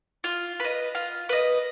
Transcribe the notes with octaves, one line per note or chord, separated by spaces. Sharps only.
F4
B4 D#5
F4
B4 D#5